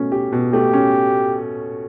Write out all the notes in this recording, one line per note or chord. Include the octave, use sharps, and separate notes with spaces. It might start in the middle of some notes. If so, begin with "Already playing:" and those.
Already playing: B2 A3 C#4
G4
B2
A3 G4
C#4